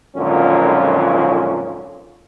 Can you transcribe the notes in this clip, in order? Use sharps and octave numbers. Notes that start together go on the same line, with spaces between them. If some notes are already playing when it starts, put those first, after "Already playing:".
G#1 F2 A#2 D3 F#3 C#4